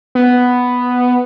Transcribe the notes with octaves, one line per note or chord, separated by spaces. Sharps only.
B3